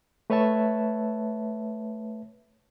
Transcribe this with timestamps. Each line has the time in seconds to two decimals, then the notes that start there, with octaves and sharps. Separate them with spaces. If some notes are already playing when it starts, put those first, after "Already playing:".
0.30 A3 B4 C#5 E5 A5